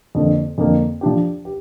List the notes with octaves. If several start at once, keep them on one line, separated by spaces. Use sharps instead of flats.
F2 D3 A#3
F2 D3 A#3
F3 D4 G4
G4